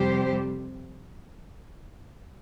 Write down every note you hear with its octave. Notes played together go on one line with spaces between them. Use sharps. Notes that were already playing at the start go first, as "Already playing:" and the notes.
Already playing: F2 C3 G3 G4 C5